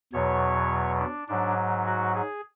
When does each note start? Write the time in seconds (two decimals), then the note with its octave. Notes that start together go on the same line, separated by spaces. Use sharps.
0.13 E2 B2 F#3 C#5
0.99 D4
1.28 G#2 F#3 D4
1.86 F#4
2.15 G#4